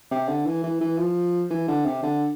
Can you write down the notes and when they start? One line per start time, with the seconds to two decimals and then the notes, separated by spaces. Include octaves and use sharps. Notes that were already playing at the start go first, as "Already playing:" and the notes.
0.11 C3
0.28 D3
0.46 E3
0.63 E3
0.81 E3
0.98 F3
1.50 E3
1.68 D3
1.85 C3
2.03 D3